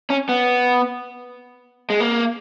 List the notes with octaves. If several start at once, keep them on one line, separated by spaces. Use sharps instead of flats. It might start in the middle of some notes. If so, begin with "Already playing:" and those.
C#4
B3
G#3
A#3